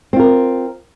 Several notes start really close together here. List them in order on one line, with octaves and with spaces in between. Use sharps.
C4 F4 A#4